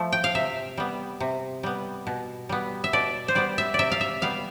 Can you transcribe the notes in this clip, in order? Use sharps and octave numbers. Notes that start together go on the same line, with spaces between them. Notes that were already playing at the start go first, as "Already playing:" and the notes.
Already playing: F3 A3
G5
F5
C3 E5
G3 B3
C3
G3 B3
B2
G3 B3
E5
B2 D5
C5
G3 B3 D5
E5
C3 D5 E5
F5
E5
G3 B3 F5